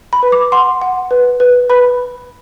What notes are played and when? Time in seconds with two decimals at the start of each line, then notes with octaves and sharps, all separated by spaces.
0.13 B5
0.23 B4
0.32 D6
0.52 F#5 C6
0.82 F#5
1.11 B4
1.40 B4
1.70 B4 B5